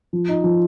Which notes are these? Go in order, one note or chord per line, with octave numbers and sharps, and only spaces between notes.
F3
D#4
F3